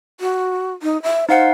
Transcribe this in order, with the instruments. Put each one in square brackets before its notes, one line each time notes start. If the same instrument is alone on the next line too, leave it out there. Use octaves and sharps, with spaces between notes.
[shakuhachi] F#4
D#4
E5
[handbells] D#4 F5 F#5 [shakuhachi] C5